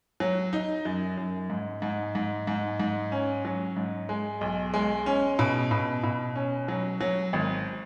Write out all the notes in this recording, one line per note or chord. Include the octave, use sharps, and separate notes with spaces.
F#3
D#4
F#2
F#2
G#2
G#2
G#2
G#2
G#2
C#4
F#3
G#2
G#3
B1
G#3
C#4
B2
B2
B2
C#4
F#3
F#3
G#1